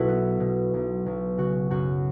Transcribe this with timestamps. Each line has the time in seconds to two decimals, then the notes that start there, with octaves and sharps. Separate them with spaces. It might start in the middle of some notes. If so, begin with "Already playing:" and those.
Already playing: B1 B2 E4 F#4 A4
0.09 B3
0.40 B2
0.74 B1
1.06 B1
1.38 C#3 F#4
1.70 F#2 F#4